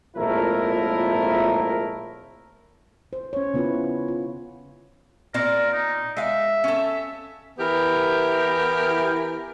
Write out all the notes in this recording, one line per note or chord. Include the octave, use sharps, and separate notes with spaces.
G#1 A#2 F3 A3 E4 A#4
C5
C#4 C#5
C#3 B3 E4 F4 B4
F4
A#2 C4 A#4 D5
D#4
G#3 E5 F5
C#4 A4
E3 B3 E4 G4 A#4